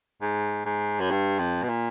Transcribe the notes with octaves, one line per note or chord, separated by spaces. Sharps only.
G#2
G#2
F#2
G2
F2
B2
A#2